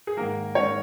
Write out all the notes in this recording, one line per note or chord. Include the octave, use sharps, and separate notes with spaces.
G#4
G#2 D#3 A#3 A#4
G#2 D#3 C#4 C#5